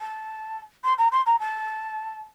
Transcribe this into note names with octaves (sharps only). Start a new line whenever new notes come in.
A5
C6
A#5
C6
A#5
A5